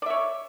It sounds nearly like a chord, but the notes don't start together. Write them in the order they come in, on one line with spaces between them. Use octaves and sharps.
D5 E5 C#5